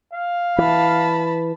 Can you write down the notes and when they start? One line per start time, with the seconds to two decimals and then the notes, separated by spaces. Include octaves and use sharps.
0.14 F5
0.58 E3 A5 B5